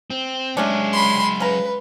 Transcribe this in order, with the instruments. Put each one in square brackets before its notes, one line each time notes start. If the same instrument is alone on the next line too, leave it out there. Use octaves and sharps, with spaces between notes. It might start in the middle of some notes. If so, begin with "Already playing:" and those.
[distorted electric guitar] C4
[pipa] C3 C#4 D4 [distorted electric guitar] F#3 G#4 [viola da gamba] G#3
[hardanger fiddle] B5 C6
[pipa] C#3 A#5 [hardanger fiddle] B4